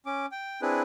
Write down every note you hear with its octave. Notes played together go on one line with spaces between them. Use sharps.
C#4 D6
G5
C4 D4 E4 G#4 B4